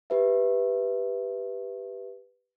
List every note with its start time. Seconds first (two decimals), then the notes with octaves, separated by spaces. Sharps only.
0.10 G4 B4 E5